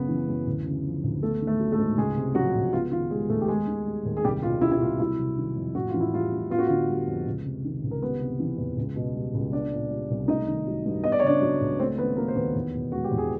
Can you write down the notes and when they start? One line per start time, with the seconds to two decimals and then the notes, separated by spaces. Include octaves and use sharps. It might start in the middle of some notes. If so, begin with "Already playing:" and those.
Already playing: F#2 C#3 B3 B4
0.08 E3
0.28 F#2
0.47 D2
0.65 C#3
0.84 F3
1.04 D2
1.22 A3 B3 A4
1.41 D#3
1.47 A3 A4
1.59 F#3
1.72 A3 A4
1.78 G#2
1.98 C#2 G#3 G#4
2.17 C3
2.35 F3 F#3 F#4
2.54 C#2
2.73 B3 F4
2.91 D#3 F4
3.10 G3 G#3 G#4
3.29 D#2 A3 A4
3.41 G4
3.48 G#3 B3 G#4
3.67 D#3
3.86 G3
4.05 D#2
4.17 G#4
4.24 C2 G3 G4
4.43 B2 F4
4.61 G3 E4
4.72 E4
4.81 C2 F4
4.99 F#3 E4
5.19 C3
5.38 D#3
5.56 F2
5.75 A2 F#4
5.89 F4
5.94 E3
6.00 E4
6.13 G3 F4
6.32 A2
6.50 B3 F4
6.59 F#4
6.67 D3 F4
6.89 G3
7.07 F2
7.27 C#2
7.45 C3
7.64 D#3
7.83 C#2
7.91 A#4
8.02 G3 B3 B4
8.21 C3
8.40 E3
8.58 E2
8.77 C#2
8.96 B2
9.15 G3
9.34 C#2
9.52 B3 D4 D5
9.72 A#2
9.90 G3
10.10 C2
10.28 A3 D#4 D#5
10.48 D#3
10.67 F#3
10.86 G2
11.04 B3 D#5
11.12 D5
11.20 C#5
11.23 C#3 D4 D5
11.42 F#3
11.61 C#2
11.79 A3 C4 C5
11.98 D#3 B3 B4
12.17 F#3 A#3 A#4
12.28 C5
12.36 D#2 B3 B4
12.55 E2
12.74 B2
12.92 G#3 F#4
13.04 G4
13.11 E2
13.18 G#4